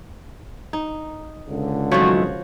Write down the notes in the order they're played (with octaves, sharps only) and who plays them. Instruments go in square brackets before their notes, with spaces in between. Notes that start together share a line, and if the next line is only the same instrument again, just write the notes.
[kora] D#4
[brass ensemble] C#2 D3
[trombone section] G#1 F#3 [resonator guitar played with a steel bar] D#3 G#3 A3 [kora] F3 F#4 C#5